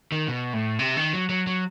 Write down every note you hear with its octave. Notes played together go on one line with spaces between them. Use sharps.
D#3
B2
A2
C3
D#3
F#3
F#3
F#3